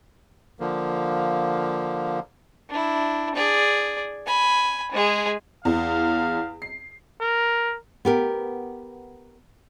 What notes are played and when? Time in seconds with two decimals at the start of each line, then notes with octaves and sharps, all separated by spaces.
0.60 D3 F3 A#3
2.69 D4 E4
3.35 G#4 D5
4.26 G#5 B5
4.92 G#3 G#4
5.65 E2 F5
6.62 C7
7.21 A#4
8.05 B3 G4 A#4